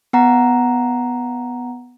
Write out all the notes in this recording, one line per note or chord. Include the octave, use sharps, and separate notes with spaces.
B3 F#5 A#5